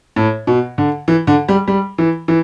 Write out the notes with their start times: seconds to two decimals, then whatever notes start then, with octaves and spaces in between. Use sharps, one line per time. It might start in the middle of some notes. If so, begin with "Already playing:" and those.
0.16 A2
0.47 B2
0.78 D3
1.08 E3
1.27 D3
1.48 G3
1.68 G3
1.98 E3
2.28 E3